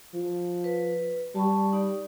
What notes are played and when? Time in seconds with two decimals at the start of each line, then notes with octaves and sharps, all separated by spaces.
0.14 F3
0.64 B4
1.35 G3 A5 B5 C#6
1.73 D#4 D5